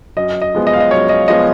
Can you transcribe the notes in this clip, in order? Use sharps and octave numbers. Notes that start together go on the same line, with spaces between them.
F#2 D#5
D#5
F3 G#3 B3
D#5
F5
D#5
F#2 C#5
D#5
F3 G#3 B3 D#5